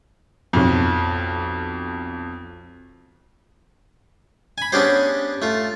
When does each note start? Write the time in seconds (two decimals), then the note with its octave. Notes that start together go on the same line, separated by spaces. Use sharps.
0.53 B1 F2
4.58 G#5 B5
4.72 B3 C#4 D4 G4 G#4 C5
5.42 A3 F4